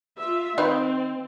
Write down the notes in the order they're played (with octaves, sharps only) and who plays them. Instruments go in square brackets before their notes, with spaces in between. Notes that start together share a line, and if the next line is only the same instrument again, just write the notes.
[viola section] F4 E5
[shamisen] D#3 B4 F5 [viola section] C4